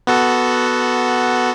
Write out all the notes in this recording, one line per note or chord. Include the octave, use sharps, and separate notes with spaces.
B3 F#4 A4